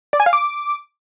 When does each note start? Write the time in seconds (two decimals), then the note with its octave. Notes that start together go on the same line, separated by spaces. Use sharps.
0.13 D5
0.20 G#5
0.26 F5
0.33 D6